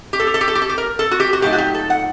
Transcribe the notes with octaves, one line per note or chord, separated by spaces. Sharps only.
G4
A4
G4
A4
G4
A4
G4
A4
G4
A#4
A4
F#4
G4
F#4
A#2 F#3 A3 D#4 G4
F#4
G4
A4
F#5